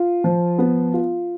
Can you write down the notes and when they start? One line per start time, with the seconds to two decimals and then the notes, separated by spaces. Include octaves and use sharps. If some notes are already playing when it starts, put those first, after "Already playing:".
Already playing: F4
0.24 F3
0.58 B3
0.94 F4